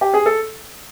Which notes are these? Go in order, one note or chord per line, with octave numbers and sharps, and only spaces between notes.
G4
G#4
A4